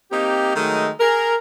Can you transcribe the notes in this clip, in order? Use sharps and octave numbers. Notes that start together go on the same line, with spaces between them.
A#3 C4 D#4 G4
D#3 F#3 G#3 A3 D#4
G#4 A#4